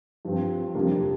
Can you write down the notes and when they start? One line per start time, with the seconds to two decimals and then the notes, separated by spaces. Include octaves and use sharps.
0.25 G2 F3 C4
0.75 F2 C3 G3 A#3 D4